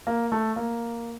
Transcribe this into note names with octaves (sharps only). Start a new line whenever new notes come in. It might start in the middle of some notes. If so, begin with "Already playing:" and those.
A#3
A3
A#3